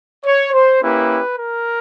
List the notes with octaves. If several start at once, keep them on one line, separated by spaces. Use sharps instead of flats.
C#5
C5
A#3 C#4 E4 G4 B4
A#4